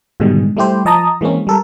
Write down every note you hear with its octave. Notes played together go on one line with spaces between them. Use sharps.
G#2 B2 D3 D#3 G3 G#3
G3 A3 E4 G4 C5
F3 D#5 A5 A#5 D#6
E3 G#3 A#3 C4 C#4
G3 A4 A#4